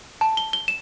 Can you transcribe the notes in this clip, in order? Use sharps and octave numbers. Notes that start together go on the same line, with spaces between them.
A5
G7
G7
E7